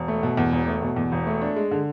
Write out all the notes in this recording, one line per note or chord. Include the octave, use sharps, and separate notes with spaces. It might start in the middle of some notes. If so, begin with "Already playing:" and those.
Already playing: E1
A3
B2
E2
E1
A3
B2
E2
E1
A3
D4
G#3
D3